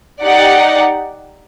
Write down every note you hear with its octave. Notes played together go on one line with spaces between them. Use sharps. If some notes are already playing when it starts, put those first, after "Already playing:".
D#4 G4 D5 F#5